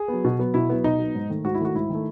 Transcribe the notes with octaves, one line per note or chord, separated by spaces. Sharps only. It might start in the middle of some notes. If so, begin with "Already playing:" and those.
Already playing: G#4
B3
F#3
B2
F#3 B3
B2 E4
F#3 B3
B2 D#4
F#3 B3
G#2
D#3 A3
G#2 F#4
E4
D#3 A3 F#4
G#2 E4
D#3 A3